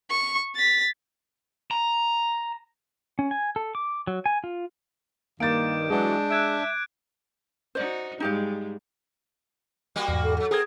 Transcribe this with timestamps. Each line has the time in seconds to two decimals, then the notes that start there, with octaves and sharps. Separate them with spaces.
0.10 C#6
0.56 A6 B6
1.71 A#5
3.19 C#4
3.31 G#5
3.56 A4
3.75 D6
4.07 F#3
4.26 G#5
4.44 F4
5.40 G2 D#3 A#3 D6 G6 A6 D7
5.90 E3 F#3 G#3 D4
6.31 E5 F#6 G#6 D7
7.75 D#4 F#4 C5 D5
8.20 G#2 G3 G#3 D#4 G4 F5
9.96 G3 A#3 F#4
10.08 E2 G#2
10.23 A4
10.37 F#2 F#3 A4
10.51 C4 G#4 A#4 D#6 G#6